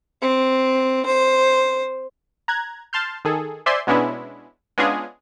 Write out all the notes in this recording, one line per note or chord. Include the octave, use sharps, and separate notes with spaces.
C4
C5
A#5 F#6 G#6
A5 C6 F6 G6
D#3 G#4 A4
C5 D5 E5 G#5 C6
B2 G#3 B3 C#4 D4 E4
G#3 B3 C#4 D4 F4 G#4